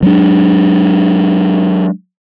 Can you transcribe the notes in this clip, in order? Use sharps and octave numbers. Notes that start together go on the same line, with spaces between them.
F#3 G#3 B3 D4